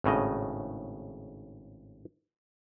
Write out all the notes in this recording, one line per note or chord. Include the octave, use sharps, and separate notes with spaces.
G#1 A2 C#3 D#5